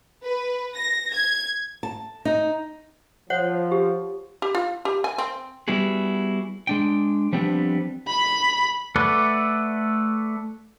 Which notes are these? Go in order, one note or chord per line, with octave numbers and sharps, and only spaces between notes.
B4
A#6
G#6
A5
D#4
F3 C5 C#5 F#5
G4
G4
F4
G4
G#5
C4
G3 B3 E4 F#4 G#4
G#3 D4 G5
F3 G3 B3 C4 D4
B5
A3 A4 B4 D5 F#5